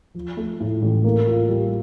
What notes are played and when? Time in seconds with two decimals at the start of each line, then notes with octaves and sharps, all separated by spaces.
0.14 F3
0.37 A3
0.60 A2
0.82 A1
1.04 A#3
1.27 F4
1.48 G3